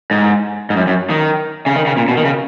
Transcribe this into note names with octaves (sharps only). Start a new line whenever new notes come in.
G#2
G#2
F#2
F#2
D#3
C#3
D#3
C#3
A#2
B2
D#3
C#3